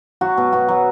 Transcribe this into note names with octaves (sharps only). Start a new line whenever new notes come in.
F#3 F#4
B2
B2 F#4
F#3